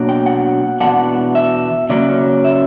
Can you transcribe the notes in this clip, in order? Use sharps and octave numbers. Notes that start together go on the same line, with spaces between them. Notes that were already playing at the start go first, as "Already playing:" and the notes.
Already playing: B2 F#3 A#3 D4
G5
F#5
E2 B2 G3 B3 D4 F#5
E5
C#3 F#3 A#3 C#4 D5
E5